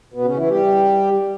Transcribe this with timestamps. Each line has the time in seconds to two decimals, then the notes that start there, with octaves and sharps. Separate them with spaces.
0.14 B2 B3
0.25 C#3 C#4
0.37 E3 E4
0.48 G3 G4